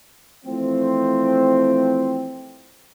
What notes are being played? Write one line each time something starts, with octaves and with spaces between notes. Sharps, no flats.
E3 F3 A3 C4